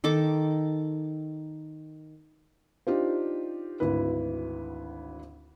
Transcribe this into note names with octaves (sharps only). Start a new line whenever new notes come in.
D#3 A4 D6
D4 D#4 F4 G4 C5
G#1 D2 E4 B4